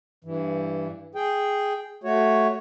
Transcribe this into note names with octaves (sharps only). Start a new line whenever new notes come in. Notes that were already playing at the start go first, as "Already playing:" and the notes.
G2 E3
G#4 G5
A3 F#4 C#5